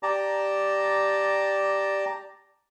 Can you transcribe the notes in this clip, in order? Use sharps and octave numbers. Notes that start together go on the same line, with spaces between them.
G4 D5 A5 A#5